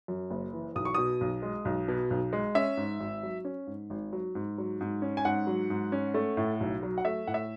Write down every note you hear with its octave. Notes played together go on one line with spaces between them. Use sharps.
F#2
F#1
E3
B1 D#6
C#6
B2 D#6
B1
G#3
B1
B2
B1
G#3
C#4 E5
G#2
G#1
F#3
C#4
G#2
G#1
F#3
G#2
F#3
G#2
C#4
G#5
G#2 F#5
F#3
G#2
C#4
A3
A2
B1
F#3
F#5
A3 E5
A2 F#5
E5